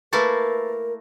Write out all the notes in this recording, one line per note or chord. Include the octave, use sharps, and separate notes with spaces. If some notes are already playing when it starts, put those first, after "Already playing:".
A3 A#3 E4 A#4 B4 A6